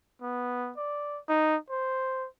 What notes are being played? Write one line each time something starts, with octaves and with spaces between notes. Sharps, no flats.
B3
D5
D#4
C5